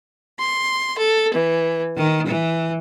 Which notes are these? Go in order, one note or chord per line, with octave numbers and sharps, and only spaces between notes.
C6
A4
E3
D#3
E3